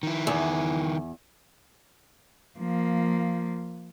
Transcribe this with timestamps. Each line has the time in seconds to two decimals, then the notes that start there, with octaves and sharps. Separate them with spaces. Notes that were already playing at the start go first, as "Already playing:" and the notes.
0.03 D#3 E4
0.27 E2
2.59 F3 A#3